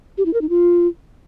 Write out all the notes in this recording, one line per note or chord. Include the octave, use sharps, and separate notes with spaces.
G4
E4
A#4
D#4
F4